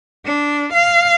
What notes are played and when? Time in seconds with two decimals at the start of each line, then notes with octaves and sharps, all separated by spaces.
0.25 D4
0.73 F5